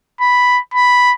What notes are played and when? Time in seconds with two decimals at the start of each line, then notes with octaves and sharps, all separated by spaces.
0.21 B5
0.74 B5